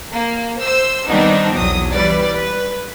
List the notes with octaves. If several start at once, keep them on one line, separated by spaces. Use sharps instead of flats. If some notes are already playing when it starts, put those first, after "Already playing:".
A#3
C5 E6
D#3 G3 B3 C4 D4 D#4
B1 E2 F#3 D#6
E3 G3 B4 D5
B4